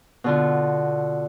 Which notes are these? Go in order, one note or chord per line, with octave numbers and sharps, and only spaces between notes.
B2 D3 F4